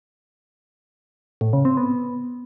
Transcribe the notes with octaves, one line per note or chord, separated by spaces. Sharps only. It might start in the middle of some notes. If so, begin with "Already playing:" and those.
A2
C#3
C4
B3